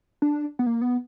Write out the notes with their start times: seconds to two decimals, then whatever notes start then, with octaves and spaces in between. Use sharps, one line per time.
0.22 D4
0.59 B3
0.66 A#3
0.81 B3